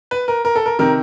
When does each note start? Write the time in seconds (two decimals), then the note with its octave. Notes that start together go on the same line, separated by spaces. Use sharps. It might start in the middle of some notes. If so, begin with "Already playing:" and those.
0.11 B4
0.28 A#4
0.45 A#4
0.56 A4
0.66 A#4
0.79 C3 D#3 A#4